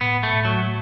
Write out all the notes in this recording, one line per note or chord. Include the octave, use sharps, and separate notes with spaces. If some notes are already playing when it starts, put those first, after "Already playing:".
A2 B3
A3
A2
F#3
A3